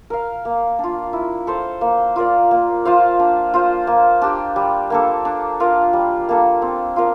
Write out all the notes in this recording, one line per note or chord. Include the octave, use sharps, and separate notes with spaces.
A#4 F5
A#3
D4 F4
E4
A4 C5 F5
A#3
F4 A#4 D5
A#3
F4 C5 F5
D4
F4 C5
A#3
D4 G4
G3
A#3 D4 A4
D4
F4 A#4 F5
G3
A#3 D4 A4
C4
F4 A#4 F5